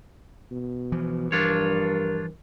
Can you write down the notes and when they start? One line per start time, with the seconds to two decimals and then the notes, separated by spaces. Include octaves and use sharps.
0.51 B2
0.92 E3 F3
1.32 G2 D4 F4 A#4 C#5